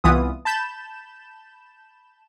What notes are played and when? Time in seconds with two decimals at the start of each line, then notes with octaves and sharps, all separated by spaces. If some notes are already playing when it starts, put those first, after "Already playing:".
0.04 C2 E3 B3 F4 D#6
0.45 A5 B5 G6 E7